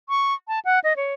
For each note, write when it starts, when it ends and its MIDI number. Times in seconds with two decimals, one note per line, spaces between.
0.09 0.34 85
0.48 0.59 81
0.65 0.79 78
0.84 0.96 75
0.96 1.14 73